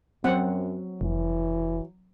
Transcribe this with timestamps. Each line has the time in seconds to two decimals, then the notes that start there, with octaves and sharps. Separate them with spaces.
0.24 F#2 F#3 C4 F#5
1.01 F1 E3